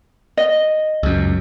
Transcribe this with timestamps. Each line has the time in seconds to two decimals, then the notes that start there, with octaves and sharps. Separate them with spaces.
0.37 D#5
1.03 C#2 F#2